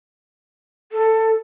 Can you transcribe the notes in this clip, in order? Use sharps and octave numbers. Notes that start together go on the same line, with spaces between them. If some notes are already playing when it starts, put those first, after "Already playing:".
A4